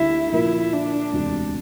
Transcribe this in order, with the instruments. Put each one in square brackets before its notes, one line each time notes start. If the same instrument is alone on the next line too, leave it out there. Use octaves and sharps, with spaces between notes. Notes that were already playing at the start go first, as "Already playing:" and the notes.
Already playing: [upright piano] D2 D3 G3 D4 [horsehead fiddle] E4
[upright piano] A#2 F3 A#3 F4 A#4 [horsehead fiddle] E4
[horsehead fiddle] D4
[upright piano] E1 D2 C3 G3